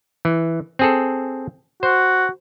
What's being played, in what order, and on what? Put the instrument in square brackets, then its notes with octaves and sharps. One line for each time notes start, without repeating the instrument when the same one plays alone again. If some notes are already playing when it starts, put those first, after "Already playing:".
[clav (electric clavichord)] E3
C4 G#4 A4
[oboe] F#4 [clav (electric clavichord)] C5